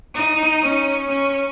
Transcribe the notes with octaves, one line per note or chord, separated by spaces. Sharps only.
D#4
C#4
C#4